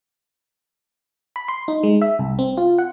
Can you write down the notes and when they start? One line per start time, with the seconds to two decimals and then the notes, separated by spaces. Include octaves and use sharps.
1.36 B5
1.48 C6
1.68 D#4
1.83 G#3
2.02 E5
2.19 C2
2.39 C4
2.57 F4
2.78 F#5